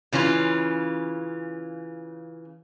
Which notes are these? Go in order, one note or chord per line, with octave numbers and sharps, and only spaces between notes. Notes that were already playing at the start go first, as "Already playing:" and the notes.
C#3 E3 C#4 F4